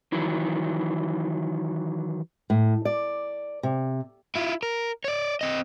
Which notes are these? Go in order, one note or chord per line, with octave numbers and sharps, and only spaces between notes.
D#3 E3 F#3
A2
D5
C3
E4 F4
A#4
C#5 D5
C4 D#5